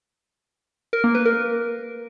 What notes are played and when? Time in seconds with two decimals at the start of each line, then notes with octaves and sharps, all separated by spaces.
0.93 A#4
1.04 A#3
1.15 B4
1.25 A#4